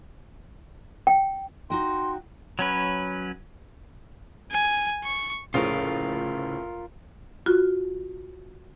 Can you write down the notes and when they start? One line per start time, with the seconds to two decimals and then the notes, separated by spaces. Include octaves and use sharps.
1.07 G5
1.70 D#4 F#4 G5 C6
2.59 F#3 C#4 B4
4.51 G#5
5.04 C#6
5.54 F1 A2 C#3 F3 F4 A#4
7.46 F4 F#4